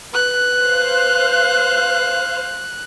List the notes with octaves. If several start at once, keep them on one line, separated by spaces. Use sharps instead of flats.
B4 F#6
C5 F5